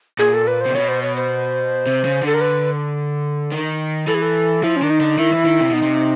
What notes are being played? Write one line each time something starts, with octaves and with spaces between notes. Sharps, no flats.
A#2 G#4
A4
B4
C3 C5
B2 C#5
C5
C#5
C5
C3
C#3
D3 A4
A#4
B4
D#3
E3 A4
G#4
A4
F3 E4
C#4
D#3 D4
D#4
D3
D#3 E4
E3
D#3
C3
B2 D#4
C3